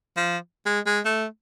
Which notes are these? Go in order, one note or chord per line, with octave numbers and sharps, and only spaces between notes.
F3
G#3
G#3
A3